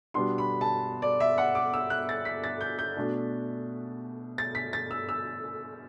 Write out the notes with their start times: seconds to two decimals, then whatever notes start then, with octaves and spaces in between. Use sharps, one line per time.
0.14 B2 G3 B3 D4 C6
0.38 B5
0.61 A5
1.02 D5
1.20 E5
1.38 F#5
1.55 D6
1.74 E6
1.90 F#6
2.09 A6
2.25 B6
2.44 A6
2.61 G6
2.79 G6
2.97 B2 A3 D4
4.38 A6
4.55 B6
4.73 A6
4.91 E6
5.09 E6